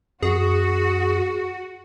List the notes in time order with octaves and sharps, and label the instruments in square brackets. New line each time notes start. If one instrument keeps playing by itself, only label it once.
[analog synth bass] F#2 [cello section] F#4 [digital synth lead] G#4